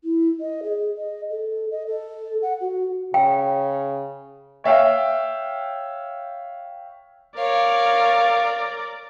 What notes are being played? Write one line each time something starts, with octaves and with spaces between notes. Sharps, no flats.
E4
D#5
G#4
D#5
A4
D#5
A4
F#5
F#4
C#3 G5
C#5 E5 F5 G5
A#4 C#5 D5 F5